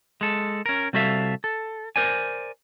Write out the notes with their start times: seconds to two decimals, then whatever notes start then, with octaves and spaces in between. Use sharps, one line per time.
0.21 G#3 A4
0.66 C#4 A#4
0.93 C3 G3 F#4 A4 E5 F5
1.44 A4
1.96 A#4 C5 D5 G#5